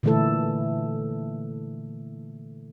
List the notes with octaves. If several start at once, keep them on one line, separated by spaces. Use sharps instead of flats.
A#2 D3 E3 A3 E4 A4